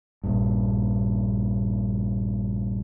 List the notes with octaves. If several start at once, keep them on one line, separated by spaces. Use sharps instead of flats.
A#1 G2